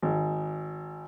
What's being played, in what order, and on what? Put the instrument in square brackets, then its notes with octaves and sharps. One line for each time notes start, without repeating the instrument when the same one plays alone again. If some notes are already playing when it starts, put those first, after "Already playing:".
[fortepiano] G#1